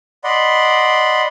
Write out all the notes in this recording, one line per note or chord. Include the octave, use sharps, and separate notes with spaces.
D5 D#5 F#5 B5 C6